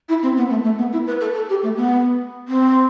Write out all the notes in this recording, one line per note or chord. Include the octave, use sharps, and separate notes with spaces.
E4
C4
B3
A3
A3
B3
E4
B4
A4
A4
G4
A3
B3
C4